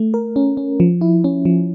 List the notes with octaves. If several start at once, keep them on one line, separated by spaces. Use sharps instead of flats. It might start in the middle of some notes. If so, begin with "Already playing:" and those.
Already playing: A3
A#4
C#4
C#4
F3
E4
C#4
F3